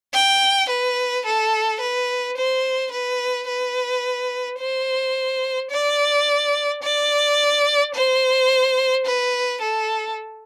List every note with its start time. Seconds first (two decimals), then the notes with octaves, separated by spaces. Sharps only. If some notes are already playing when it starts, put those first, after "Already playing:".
0.14 G5
0.69 B4
1.25 A4
1.80 B4
2.37 C5
2.92 B4
3.47 B4
4.59 C5
5.71 D5
6.82 D5
7.94 C5
9.06 B4
9.61 A4